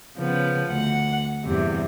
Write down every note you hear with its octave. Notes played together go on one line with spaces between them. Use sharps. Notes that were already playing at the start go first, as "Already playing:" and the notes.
C#3 F3 B3
D2 F#5
E2 G2 C3